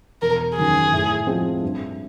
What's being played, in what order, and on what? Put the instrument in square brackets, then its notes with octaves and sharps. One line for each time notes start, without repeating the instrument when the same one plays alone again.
[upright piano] E1 [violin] A#4
[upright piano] D#2 C#3 F#3 [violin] G#4
[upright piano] A2
F3 G#3 C4
G2